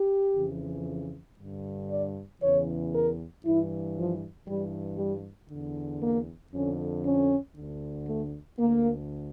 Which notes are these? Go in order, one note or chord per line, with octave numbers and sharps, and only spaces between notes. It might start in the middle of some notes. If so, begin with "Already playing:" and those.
Already playing: G4
F2 C#3 E3
G2 D3
D5
E2 C#3 E3 C#5
A#4
G2 E3 E4
F3
G2 E3 G3
G3
E2 D3
A#3
F2 D3 C#4
C#4
D2 D3
A3
D2 D3 A#3